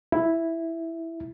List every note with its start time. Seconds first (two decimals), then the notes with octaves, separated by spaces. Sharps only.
0.12 E4